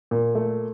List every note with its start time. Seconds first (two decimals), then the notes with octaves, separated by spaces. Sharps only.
0.11 A#2
0.35 A3